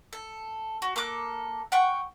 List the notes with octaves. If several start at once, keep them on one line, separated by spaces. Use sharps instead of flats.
A4
F#4
A#3 A4 D6 F#6
F#5 G5 C#6